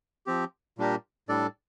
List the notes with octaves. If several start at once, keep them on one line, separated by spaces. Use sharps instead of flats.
F3 C4 G4
A#2 G3 D4 G4 A#4
A2 G3 D4 A4 D5